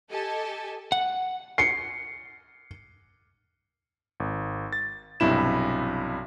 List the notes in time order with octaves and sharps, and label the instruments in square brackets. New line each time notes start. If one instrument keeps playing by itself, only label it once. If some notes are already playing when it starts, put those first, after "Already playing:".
[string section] G4 A4 D#5 G#5 A5
[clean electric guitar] F#5
[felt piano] C7 C#7
[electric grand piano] G#1
A6
B1 G2 C3 E4 E7